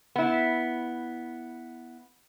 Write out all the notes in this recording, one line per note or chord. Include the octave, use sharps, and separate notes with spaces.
B3 E4